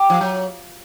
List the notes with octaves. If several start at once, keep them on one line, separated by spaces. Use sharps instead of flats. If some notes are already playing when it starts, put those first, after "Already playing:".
Already playing: G4
F3
F#3